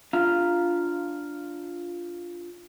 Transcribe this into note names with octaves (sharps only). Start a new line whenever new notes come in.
D4 F4 F5 A#5